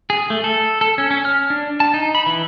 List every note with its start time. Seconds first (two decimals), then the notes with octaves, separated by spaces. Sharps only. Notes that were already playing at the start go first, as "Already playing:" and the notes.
0.10 G#4
0.30 A3
0.44 A4
0.81 A4
0.98 C#4
1.11 C#4
1.25 F6
1.50 D4
1.80 A5
1.94 D#4
2.15 B5
2.26 E3